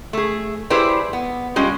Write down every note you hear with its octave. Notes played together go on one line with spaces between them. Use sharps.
A3 G#4
E4 G4 G#4 B4 C5 D5
B3
G3 G#3 C#4 F4